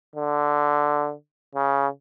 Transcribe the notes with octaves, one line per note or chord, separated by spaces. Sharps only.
D3
C#3